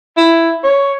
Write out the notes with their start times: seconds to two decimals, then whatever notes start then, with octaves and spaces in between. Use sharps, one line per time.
0.17 E4
0.64 C#5